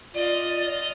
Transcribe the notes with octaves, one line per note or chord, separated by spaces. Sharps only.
F4 D5 D#5 F5